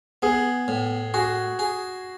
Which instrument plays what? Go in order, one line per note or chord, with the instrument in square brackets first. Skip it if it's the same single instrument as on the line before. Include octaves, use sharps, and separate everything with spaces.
[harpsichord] B3 [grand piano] G#4
[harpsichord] A2
[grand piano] F#4 [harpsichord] G#4
[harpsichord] G#4